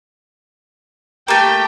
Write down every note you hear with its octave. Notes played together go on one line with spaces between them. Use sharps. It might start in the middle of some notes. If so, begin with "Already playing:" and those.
A3 A#3 G4 G5